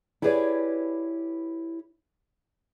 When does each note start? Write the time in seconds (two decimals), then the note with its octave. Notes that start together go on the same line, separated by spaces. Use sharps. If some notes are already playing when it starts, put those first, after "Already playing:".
0.22 E4 G4 G#4 B4 C#5 D5